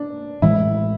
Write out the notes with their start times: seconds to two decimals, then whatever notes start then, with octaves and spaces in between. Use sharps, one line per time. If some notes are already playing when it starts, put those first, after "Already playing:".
Already playing: D4
0.42 A1 A2 E3 G#3 E4